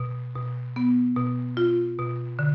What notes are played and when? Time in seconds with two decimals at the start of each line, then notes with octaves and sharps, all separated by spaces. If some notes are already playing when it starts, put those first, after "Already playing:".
Already playing: B2
0.35 B2
0.76 B3
1.16 B2
1.57 F4
1.99 B2
2.39 D3